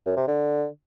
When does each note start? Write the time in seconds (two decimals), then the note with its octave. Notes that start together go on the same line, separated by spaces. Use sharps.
0.06 F#2
0.17 C3
0.27 D3